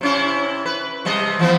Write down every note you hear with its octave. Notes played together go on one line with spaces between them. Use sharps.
C3 C#4 E4
B4
C3 G3 D#5
E3 F3 B3